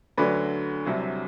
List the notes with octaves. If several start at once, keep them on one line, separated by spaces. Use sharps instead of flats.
D2 D3 F#3 B4 D5
C2 C3 F#3